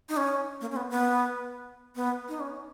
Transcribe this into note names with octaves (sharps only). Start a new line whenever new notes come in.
D#4
C#4
A#3
C#4
B3
B3
B3
D#4
C#4